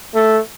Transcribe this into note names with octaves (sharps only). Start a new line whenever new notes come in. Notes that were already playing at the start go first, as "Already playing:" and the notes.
A3